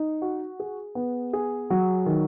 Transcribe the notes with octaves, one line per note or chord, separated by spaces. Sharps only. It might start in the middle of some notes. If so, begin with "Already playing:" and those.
Already playing: D#4
F#4
G#4
B3
G#4
F#3
D#3